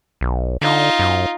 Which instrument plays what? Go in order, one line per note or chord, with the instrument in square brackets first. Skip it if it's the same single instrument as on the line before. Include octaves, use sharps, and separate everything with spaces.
[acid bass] B1
[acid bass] D3 [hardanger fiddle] D#4 F4
[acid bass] F#2